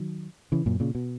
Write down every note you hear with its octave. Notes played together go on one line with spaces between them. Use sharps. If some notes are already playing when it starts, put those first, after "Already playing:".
Already playing: D#3 F#3
C#3 E3
F#2 A#2
A#2 C#3
B2